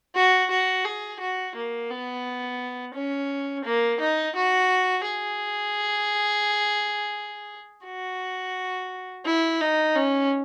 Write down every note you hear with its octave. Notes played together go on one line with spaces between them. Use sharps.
F#4
F#4
G#4
F#4
A#3
B3
C#4
A#3
D#4
F#4
G#4
F#4
E4
D#4
C#4